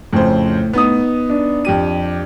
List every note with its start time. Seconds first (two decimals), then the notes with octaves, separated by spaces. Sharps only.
0.13 F2 A2 C#3 C5
0.73 B3 D#4 D#6
1.30 D4
1.65 F2 G4 D#7